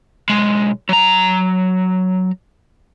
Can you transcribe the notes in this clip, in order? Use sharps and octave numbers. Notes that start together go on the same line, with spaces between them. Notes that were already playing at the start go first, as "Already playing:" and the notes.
B1 G#3
F#3 A#5